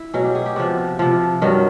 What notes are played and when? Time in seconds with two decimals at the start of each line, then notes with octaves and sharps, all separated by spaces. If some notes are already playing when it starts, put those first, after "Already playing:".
Already playing: E4
0.14 B2 F#3 G#4
0.24 G4
0.35 G#4
0.46 G4
0.56 C3 F3 F#4
0.99 C3 F3
1.42 G2 D#3 F#3